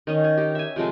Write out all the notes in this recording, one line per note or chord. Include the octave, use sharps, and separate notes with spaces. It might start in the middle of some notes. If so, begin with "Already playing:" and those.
D#3 C#4 D#5
C#5
D#4 G4
E5 G#5
C3 F3 G#3 A3